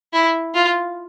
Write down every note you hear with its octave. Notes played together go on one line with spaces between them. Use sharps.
E4
F4